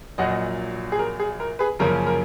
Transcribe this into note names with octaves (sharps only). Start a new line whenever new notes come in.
A#1 A#2 F#3 D#5 F#5
G#4
A#4
G#4
A#4
G#4 B4
F#2 C#3 F3 A#3 C#4 A#4
A#4